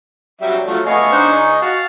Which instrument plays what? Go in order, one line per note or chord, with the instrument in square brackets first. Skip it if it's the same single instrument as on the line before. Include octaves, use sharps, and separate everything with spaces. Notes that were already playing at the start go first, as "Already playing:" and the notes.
[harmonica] F#3 G3 E5
F3 F#3 A3
[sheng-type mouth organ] A3 B3 F5 [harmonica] D#5 G#5 C#6
[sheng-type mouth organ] D4 D#4 C5
D#4
[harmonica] F#4 [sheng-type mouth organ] F5 A5